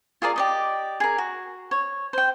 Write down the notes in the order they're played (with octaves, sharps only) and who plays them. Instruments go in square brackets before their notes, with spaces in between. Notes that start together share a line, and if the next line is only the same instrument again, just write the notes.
[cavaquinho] F4 G#4 A#4 D5
G4 D5 D#5
G#4 A#4
F#4
C#5
C5 G5